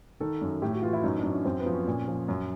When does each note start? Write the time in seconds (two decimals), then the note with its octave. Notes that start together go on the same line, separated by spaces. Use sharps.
0.20 D#3 A4
0.41 F#2
0.62 A2 G4
0.72 F#4
0.82 E3 F4
0.93 E4
1.03 F#2 D#4
1.18 D4
1.24 F#2
1.31 C#4
1.45 F#2 C4
1.59 B3
1.66 F3
1.73 C#4
1.87 A#2
2.08 F3
2.28 F#2